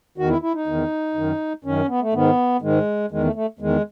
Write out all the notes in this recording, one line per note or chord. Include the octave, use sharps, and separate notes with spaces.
E2 D#3 F#4
E4
E4
D#4
E2 D#3
F#2 D#3
F#2 D#3 C#4
B3
A3
G#2 D#3 B3
G#2 D#3 G#3
E2 D#3 G#3
A3
A3
E2 D#3 G#3